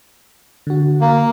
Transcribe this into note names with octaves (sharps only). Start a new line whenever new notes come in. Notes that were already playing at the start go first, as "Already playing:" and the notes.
D3 F#4
A#3